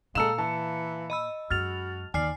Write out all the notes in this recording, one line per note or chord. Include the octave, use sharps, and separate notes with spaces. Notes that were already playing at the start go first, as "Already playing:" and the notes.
A#2 G#3 A4 F5 A#5 E6 C#7 E7
E3 A5
D#5 B5 E6
F#2 G#3 F#4 F6 A6 F7
D#2 D5 G#5 F6 C7